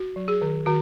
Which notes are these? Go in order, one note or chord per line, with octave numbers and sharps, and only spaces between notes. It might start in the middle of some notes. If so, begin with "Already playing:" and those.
Already playing: F#4
F#3
G#4
D#3
D#3 F#4